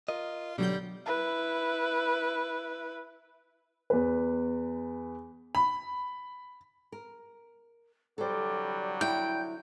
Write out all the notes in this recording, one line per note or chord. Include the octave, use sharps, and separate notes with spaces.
F4 A#4 D#5
B1 B2 D3 F#3 G3 G6
E4 B4
E2 B4
B5
A#4
C2 D3 F#3 G3 A4 C5
E4 G5